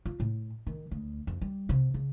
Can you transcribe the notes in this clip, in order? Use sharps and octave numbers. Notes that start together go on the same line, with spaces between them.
F4
A2
D#3
D2
F2
G3
C3
C#3